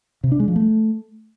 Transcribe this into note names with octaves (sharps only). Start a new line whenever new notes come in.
C3
D4
G#3
F3
A3